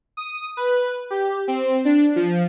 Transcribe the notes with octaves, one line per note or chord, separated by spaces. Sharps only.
D#6
B4
G4
C4
D4
F3